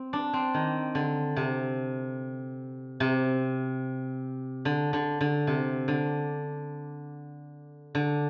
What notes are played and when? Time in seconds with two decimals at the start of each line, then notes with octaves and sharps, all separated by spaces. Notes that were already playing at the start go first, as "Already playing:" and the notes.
Already playing: C4
0.13 D4
0.33 C4
0.54 D#3
0.95 D3
1.36 C3
3.00 C3
4.65 D3
4.93 D3
5.21 D3
5.47 C3
5.88 D3
7.95 D3